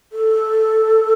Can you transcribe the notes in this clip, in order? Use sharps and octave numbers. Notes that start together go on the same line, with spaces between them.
A4